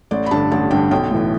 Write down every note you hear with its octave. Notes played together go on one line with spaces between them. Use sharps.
A1 D5
B5
G2 D3 A5
A1 A5
G2 D3 G5
B1 G5
A2 E3